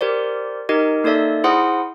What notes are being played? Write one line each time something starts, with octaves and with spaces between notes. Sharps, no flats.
G4 A#4 C5 D5
D#4 G4 A#4 D#5
A#3 D#4 A4 D5 E5
E4 G#4 C5 F#5 C6 D#6